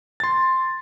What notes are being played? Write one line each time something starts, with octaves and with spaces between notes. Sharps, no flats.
C6 A6